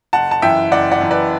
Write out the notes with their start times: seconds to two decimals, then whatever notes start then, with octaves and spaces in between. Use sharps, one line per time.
0.13 F#1 F#5 A5
0.31 A5
0.42 F#2 E3 E5 G5
0.71 F#1 D5 F#5
0.91 D5 F#5
1.01 F#2 E3
1.11 B4 D5